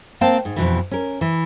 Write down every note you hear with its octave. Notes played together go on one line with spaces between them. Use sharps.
A#3 C4 F5 G5 A5
G#2
F2 B2 E3
C#4 A#4
E3